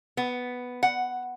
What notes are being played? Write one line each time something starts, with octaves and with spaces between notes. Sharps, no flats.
B3
F#5